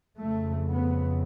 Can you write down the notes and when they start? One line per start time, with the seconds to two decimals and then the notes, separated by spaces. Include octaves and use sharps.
0.17 F2 C#3 A3
0.69 B3